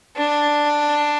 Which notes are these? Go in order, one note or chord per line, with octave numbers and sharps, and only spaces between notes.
D4